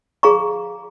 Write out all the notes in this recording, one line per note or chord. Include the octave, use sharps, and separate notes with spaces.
G#4 F5 A#5 C#6